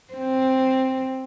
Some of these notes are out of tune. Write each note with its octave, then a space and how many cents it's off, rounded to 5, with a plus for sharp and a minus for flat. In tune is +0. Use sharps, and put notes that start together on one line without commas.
C4 +5